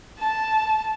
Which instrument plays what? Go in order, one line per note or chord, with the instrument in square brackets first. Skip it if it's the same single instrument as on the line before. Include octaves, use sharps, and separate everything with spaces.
[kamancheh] A5